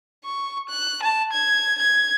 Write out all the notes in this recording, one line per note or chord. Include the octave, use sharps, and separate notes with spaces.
C#6
F#6
A5
G#6
G#6